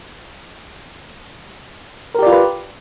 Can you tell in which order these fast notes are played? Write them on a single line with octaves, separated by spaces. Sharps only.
A#4 G4 D5 F4 B4